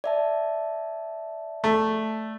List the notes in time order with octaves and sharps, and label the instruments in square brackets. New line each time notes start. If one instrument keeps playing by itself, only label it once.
[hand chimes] D5 E5 A5
[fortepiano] A3